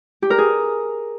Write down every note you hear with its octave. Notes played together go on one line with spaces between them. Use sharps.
G4
A#4
G#4